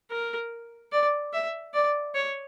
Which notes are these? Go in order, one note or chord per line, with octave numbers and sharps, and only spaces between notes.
A#4
D5
E5
D5
C#5